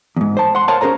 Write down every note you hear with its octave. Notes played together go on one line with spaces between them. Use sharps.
E2 G#2
C5 A5
F#5 C6
A#4 C5 C#5 F5 F#5 A5
C#4 G#4 A#4 C5 A#5